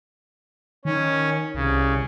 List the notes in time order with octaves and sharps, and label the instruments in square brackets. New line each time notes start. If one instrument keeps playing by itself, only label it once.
[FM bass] D#3 [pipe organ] C#4
[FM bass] C2 [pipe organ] C#3